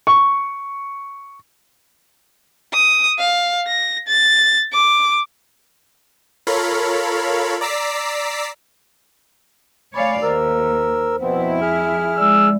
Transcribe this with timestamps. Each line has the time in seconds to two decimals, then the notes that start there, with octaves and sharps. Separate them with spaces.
0.07 C#6
2.73 D#6
3.19 F5
3.68 A#6
4.08 A6
4.73 D6
6.47 F4 A4 A#4 C#5 F5 B5
7.61 D5 A#5 D6 E6 B6 C7
9.94 A3 C#5 D5 F5 G#5 B5
10.23 D#2 A#4 C5 E6
11.21 F2 B2 B3 C4 E4
11.62 G#4 F6
12.17 G#3 D5 E6